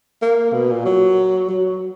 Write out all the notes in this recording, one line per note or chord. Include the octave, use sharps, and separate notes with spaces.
A#3
B2
A#2
F#3
F#3